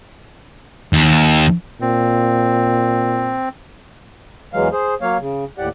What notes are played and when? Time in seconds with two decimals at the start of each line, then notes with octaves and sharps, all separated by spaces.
0.93 D#2
1.82 A#2 C4
4.53 E2 E3 F#3 G#3 F5
4.72 G#4 C5
5.01 F#3 A#3 C#5 F5
5.20 C#3
5.58 D#2 A2 G4 D5 F#5